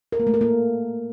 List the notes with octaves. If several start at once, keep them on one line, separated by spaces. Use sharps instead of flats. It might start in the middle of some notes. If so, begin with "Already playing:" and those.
A#4
A#3
A3
A#4
A#3